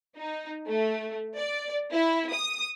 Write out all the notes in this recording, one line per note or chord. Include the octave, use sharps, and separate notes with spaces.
D#4
A3
D5
E4
D#6